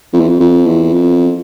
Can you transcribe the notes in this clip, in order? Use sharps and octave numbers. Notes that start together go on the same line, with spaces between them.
F2
E2
F2
F2
E2
F2